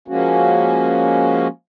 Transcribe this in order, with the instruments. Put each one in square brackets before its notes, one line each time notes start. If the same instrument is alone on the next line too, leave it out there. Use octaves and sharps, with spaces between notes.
[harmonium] F3 G#3 A#3 C#4 F#4